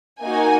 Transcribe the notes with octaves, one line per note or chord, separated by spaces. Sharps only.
A#3 D#4 F#4 G#5